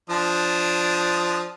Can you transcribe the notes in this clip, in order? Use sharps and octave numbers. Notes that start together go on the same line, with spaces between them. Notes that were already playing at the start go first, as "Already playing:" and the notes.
F3 D4 D#6